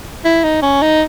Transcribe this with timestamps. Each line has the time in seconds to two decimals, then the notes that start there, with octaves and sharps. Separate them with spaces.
0.25 E4
0.44 D#4
0.62 C#4
0.82 D#4